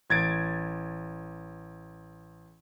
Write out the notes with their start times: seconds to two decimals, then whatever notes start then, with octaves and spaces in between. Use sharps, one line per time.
0.10 A1 G#6 A6 D7